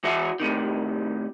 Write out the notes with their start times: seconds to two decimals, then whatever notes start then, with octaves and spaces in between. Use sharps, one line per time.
0.04 E3 F#4 E5
0.40 A2 C3 D#3